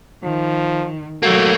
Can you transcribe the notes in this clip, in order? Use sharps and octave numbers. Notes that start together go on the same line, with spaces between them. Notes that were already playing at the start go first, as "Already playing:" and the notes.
D#3 F3
F#3 A3 A#3 F#4